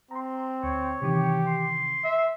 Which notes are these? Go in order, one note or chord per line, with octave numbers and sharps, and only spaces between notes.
C4 A#5 C6
D2 C#5
C3 D#3 E3 G4
C6
E5